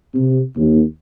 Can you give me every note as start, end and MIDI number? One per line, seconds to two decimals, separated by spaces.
0.14 0.41 48
0.57 0.83 39